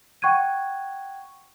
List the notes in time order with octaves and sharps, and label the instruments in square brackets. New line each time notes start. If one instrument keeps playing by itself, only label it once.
[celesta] F#5 G5 C#6 F#6 G#6 D#7